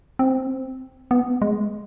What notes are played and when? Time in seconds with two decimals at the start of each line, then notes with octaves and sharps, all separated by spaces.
0.19 C4
1.11 B3
1.42 G#3